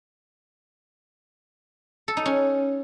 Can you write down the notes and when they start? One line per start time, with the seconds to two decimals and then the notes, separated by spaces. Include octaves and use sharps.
2.08 A4
2.17 D#4
2.26 C#4